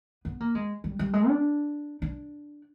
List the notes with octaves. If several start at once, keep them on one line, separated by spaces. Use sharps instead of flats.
B3
A#3
G#3
G3
G3
G#3
D4
D4